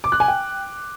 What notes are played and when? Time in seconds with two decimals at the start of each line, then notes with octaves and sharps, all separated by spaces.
0.04 D6
0.12 F#6
0.20 G#5
0.28 G5